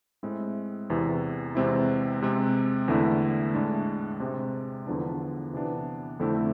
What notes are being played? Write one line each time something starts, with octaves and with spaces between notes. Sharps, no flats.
A2 G#3 C4 E4
E2 C3 E3
E2 C3 G#3 C4 E4
C3 G#3 C4
E2 D3 A3 E4
A2 G#3 D4
C3 G#3 C4
E2 D3 F3 B3 D4
C3 E3 B3 D4
F2 D3 A3 C4 E4